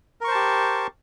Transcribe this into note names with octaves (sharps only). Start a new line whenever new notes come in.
G4 A#4 C5 A5 C#6